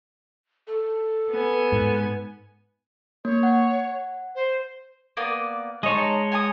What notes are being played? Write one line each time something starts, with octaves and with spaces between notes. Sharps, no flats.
A4
B3 G#5
G#2
A#3 C#5
F#5
C5
A#3 B3 D5
G#3 D#4 C#5 A5
G#5 A5 D#6